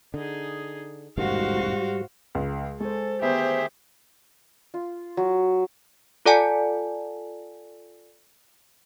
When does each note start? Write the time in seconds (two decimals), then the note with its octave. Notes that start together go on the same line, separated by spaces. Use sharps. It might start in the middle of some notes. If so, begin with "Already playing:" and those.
0.14 D3 D#4 G#4
1.17 E1 A1 G#2 D#3 G3 F#4 C5 F5
2.35 C#2 G#3
2.80 G#3 A4 C5 G#5 C#6
3.22 D2 D#3 B3 G4 G#4 C5 E5 G6
4.74 F4
5.17 F#3
6.25 F4 A4 D5 F#5 G#5 A5